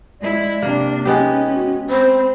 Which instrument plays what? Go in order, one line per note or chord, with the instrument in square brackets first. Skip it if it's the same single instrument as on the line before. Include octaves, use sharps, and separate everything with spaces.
[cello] G#3 E4 [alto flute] D5
[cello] C3 D4 [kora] A#3
[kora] G#3 B3 G4 [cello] C#4 [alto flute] D#4
[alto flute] F#4
[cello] C4 [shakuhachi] C5 [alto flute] B5